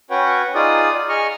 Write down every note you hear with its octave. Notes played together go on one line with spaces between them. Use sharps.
C#4 F#4 B4 C#5 F#5 G5
D#4 F4 G#4 D5 D#6
G#4 D#5 C#6 F6